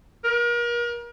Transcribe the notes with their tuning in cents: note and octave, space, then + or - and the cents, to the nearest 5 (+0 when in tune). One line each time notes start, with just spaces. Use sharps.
A#4 +35